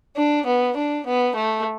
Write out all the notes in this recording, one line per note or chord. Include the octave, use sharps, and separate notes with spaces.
D4
B3
D4
B3
A3